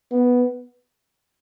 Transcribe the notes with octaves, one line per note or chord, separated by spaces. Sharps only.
B3